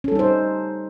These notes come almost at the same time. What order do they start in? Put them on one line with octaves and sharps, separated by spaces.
C#4 A4 G3 D#4 C5